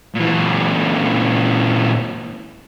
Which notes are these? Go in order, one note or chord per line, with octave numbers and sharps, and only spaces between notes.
A#2 E3